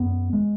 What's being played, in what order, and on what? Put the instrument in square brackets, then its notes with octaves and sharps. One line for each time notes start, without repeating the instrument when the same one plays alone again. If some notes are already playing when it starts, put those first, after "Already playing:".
Already playing: [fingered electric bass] F#2 B3
G#3